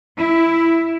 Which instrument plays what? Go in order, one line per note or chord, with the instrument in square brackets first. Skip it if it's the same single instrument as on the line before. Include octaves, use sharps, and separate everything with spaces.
[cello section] E4